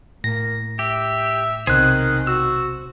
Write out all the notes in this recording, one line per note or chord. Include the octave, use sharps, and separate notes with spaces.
A2 A#3 A#6
G4 E5
B1 C3 D#3 G#4 C5 F#6
F#4 E6